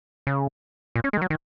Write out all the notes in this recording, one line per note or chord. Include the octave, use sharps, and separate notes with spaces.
C#3
A#2
C#4
G#3
D#3
F#3
D#3